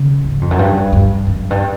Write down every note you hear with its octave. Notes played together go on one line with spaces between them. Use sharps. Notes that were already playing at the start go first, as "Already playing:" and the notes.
Already playing: C#3
G#2
F2
F#2
G2
G2
F#2
G2